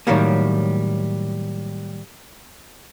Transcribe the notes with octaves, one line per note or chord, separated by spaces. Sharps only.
A2 C3 D#3 F#3 G3 A#3